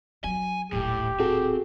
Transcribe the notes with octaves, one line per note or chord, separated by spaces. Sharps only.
F#3 G#5
D#1 A1 A2 G4
C4 F#4 G#4 A4